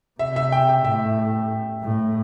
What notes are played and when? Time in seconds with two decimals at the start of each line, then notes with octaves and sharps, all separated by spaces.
0.19 C3 E5
0.36 E5
0.52 G5
0.69 G5
0.85 A2 E5
1.83 A2